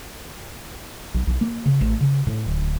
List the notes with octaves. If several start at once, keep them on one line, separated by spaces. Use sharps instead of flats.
B1
B1
A#3
C#3
A1
C#3
A2
D1